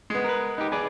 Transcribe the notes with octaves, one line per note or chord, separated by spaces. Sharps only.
G#3 B3
A#4 B4
D#4 G4
G#4 B4 D5